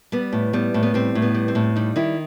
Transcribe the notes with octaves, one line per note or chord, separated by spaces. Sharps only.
G3 B3
A2
G3 B3
A2
B3
G3 C4
A2
B3
G3
C4
A2
G3 D#4
D#3 E4